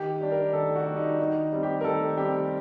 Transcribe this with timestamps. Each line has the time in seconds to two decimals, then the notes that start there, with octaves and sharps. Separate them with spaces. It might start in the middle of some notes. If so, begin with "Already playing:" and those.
Already playing: D#3 G4
0.21 G3 D4
0.32 A#4
0.53 D#3 A4
0.76 F#4
0.87 G3 D4
0.97 D#4
1.19 D#3 D#4
1.52 G3 C4
1.63 G4
1.81 A#4
1.84 D#3 A4
2.17 G3 C4 G4